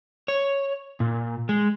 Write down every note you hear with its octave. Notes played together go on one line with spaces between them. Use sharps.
C#5
A#2
G#3